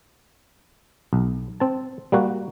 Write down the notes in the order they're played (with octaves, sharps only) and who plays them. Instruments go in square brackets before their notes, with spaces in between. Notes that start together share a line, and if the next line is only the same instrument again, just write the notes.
[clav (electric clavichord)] B1
C4 A5
G3 A#3 F#4